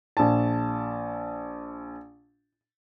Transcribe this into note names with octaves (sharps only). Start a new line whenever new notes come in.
A#1 A5